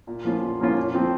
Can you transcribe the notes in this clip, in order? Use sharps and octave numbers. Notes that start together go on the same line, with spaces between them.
A#2
F3 A#3 C#4 F4
A#2
F3 A#3 C#4 F4
A#2
F3 C4